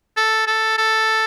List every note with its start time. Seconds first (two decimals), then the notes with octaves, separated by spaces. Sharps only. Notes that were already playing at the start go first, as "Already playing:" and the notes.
0.17 A4
0.47 A4
0.78 A4